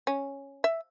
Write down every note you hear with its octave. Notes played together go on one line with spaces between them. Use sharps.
C#4
E5